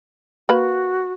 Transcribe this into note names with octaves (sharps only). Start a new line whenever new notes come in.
A#3 F#4 B4